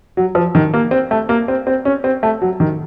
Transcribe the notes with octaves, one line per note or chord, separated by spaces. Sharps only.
F#3
F3
D#3
A#3
C4
A3
A#3
C4
C4
C#4
C4
A3
F#3
D#3